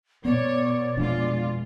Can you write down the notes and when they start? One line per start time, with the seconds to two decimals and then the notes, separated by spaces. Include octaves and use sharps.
0.25 B2 B3 C#5 D5
0.97 F1 F2 G#3 D4 F4